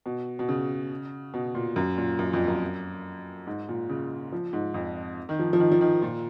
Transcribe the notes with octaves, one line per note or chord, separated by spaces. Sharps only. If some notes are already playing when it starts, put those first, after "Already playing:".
B2
B2
C#3
B2
A#2
F#2
A#2
F#2
F2
F#2
G#2
A#2
C#3
F3
G#2
F2
D#3
F3
F3
D#3
F3
D#3
A#2